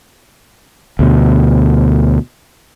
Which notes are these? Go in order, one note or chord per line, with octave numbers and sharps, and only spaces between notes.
D2 B2